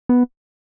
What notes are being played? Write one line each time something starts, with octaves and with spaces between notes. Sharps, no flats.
B3